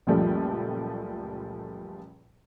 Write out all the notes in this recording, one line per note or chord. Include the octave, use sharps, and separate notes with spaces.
C#2 F#2 A#2 F3 G3 A3